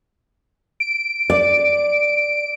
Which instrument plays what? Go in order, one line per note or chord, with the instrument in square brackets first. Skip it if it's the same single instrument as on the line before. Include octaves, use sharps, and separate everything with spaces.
[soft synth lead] D7
[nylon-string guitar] D5